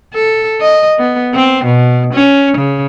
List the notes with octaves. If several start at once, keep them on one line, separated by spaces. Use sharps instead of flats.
A4
D#5
B3
C4
B2
C#4
C#3